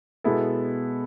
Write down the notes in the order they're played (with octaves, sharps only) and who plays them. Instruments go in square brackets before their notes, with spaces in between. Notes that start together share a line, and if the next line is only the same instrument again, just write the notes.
[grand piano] B2 G#3 B3 E4 A4